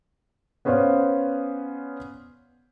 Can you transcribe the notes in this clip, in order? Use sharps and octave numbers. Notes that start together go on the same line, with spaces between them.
B3 C#4 B4 C5 D5 F5